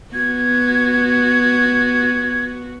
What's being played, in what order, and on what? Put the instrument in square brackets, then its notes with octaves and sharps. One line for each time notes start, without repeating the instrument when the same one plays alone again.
[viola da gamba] B3 F#4 [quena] G#6